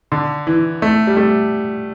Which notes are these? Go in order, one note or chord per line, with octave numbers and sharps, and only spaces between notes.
D3
E3
A3
G3
A3